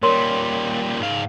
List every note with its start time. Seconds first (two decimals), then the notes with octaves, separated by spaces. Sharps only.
0.03 A#2 G3 A#4 C#5 C6
1.00 G#2 F5